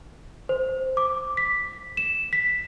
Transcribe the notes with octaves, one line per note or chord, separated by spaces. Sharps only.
C5
D6
B6
E7
B6